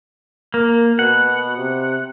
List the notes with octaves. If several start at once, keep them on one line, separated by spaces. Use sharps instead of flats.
A#3 A#4
B2 F#5
C3